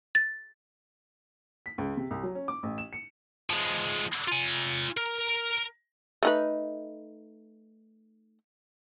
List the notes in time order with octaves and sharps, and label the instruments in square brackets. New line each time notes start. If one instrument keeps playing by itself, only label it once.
[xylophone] A6
[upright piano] B6
C#2
C3
C2
F#3
C#4
D6
A1
E7
C#7
[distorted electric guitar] F3 G#3
F4 G#5
A#4
[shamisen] A3 D#4 B4